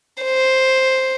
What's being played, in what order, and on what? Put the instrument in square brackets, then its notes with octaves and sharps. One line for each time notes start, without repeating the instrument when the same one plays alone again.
[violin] C5